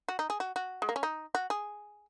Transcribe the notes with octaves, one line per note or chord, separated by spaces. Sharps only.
F#4
D#4
G#4
F#4
F#4
G#3
A#3
C#4
D#4
F#4
G#4